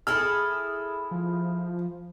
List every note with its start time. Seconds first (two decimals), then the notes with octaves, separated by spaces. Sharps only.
0.07 E4 G#4 A4 F6
1.11 F3